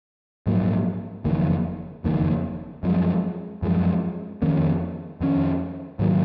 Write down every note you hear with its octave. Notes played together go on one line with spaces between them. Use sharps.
A#1 G#2 F#3 A#3
F#1 F2 D#3 A#3
F#1 F2 D#3 A#3
F#2 F3 G#3
F#2 F3 G#3
F2 D#3 A#3 C#4
F2 D#3 A#3 C#4
G#2 D#3 F#3 A#3